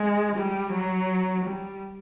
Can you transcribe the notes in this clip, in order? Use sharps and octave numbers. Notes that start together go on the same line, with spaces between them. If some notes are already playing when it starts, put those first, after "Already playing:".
Already playing: G#3
G3
F#3
G3